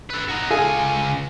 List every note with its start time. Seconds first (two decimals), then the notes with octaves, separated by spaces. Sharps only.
0.10 A4 B4
0.29 D#4 F#4
0.50 C#2 F4 G#4 A4 G#5